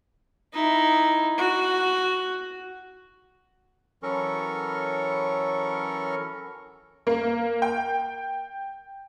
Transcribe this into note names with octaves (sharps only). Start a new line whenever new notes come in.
D#4 E4
F#4
E3 F#3 C#4 A4 A#4 C#6
A#3
G5